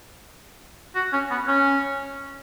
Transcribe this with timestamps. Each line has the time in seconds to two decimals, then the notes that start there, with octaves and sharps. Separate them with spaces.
0.95 F#4
1.12 C#4
1.31 B3
1.48 C#4